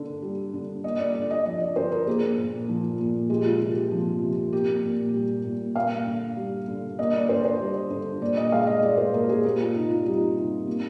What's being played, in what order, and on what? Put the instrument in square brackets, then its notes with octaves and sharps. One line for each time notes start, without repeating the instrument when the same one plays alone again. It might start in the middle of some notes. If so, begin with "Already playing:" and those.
Already playing: [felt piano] D3 A#3
G3
D3
A#3 D#5
D5
D3 D5
D#5
F3 D#5
D5
D3 C5
A#4
A#3 G#4
A#2
F3
A#2
G#3 G4
F4
C3 F4
G4
F3
C3
A#3 G4
A#2
G3
A#2
A#3 F5
D3
G3
D3
A#3 D#5
D5
D3 C5
C5
G3
D3
A#2 D5
D#5
G#3 F5
D#5
G#3 D5
C5
A#2 A#4
G#4
A#3 G4
F4
C3 D#4
F4
G3 D#4
C3
A#3